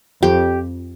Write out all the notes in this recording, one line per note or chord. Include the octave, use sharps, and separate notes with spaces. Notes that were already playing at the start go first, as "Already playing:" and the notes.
F2 G4